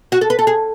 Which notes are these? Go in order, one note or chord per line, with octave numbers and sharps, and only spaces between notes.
F#4
A4
B4
A4
G#4